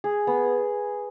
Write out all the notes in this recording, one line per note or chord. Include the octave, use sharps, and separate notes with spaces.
G#4
B3